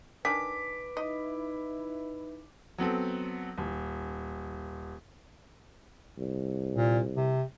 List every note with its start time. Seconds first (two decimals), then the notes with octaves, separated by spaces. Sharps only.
0.25 D#3 D4 B4 G#5 D6 B6
0.97 D#4 E4 D#5
2.78 F#3 B3 C4 A4
3.58 D#1
6.18 C2
6.76 A#2
7.17 C3